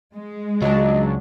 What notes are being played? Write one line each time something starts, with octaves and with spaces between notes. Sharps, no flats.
G#3
C#2 F#3 D4 D#5